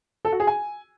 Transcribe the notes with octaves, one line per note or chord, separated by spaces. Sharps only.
A4
F#4
G#4
G#5